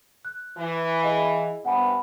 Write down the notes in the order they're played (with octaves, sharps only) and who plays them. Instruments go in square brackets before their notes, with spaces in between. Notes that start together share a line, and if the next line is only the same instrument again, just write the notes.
[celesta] F#6
[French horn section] E3
[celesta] G#4 D#5 F5
[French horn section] G2 C3 B3 [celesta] F#5 G#5 B5